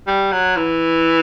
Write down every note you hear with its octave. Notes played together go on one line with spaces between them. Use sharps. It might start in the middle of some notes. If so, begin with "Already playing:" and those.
G3
F#3
E3